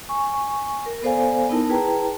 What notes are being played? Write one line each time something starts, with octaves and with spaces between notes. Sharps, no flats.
G#5 C#6
A#4
B3 A4 C5 D5 F5 G#5
B3 D#4 E4 A#4 A5
E4 G#4 B4 G5 A5 A#5